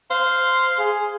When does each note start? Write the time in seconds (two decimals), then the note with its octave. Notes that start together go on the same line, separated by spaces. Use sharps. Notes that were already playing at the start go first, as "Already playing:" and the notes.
0.10 C5 F5
0.79 G#4